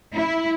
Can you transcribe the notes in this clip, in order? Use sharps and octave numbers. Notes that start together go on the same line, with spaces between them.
E4